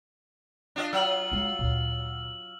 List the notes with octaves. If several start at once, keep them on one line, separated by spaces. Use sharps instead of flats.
D4 F4 D#5
F#3 F4 E6 F6 F#7
G#3 D4
D2 A#2